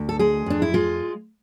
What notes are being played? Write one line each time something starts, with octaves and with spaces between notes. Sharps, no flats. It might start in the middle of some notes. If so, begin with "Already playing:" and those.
Already playing: D2
A4
G#3 G#4
F2 D4
E4
G#3 F4